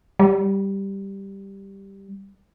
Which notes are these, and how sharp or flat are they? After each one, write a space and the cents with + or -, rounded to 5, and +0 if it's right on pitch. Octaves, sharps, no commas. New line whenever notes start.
G3 +0